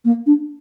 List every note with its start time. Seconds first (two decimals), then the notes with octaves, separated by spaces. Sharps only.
0.05 A#3
0.26 D4